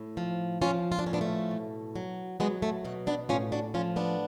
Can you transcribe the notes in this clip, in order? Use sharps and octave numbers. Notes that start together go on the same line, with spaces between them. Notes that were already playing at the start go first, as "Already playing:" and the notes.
Already playing: A2
F3
F3 C#4 F4
F4
D4
A2 C#4
B3 D4
A3 C#4
B2
F#3
F#3 G#3 B3
A3
B2 A3
B3 D4
A2 C#4 F4
D4 F#4
F3 C#4 F4
B3 D4